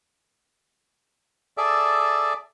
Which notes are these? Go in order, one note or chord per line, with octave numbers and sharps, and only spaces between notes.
G#4 A4 D5 E5